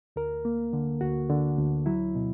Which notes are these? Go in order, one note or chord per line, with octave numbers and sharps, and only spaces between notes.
D2 A#4
A#3
D3
D2 F#4
D3
D2
F#3 E4
B2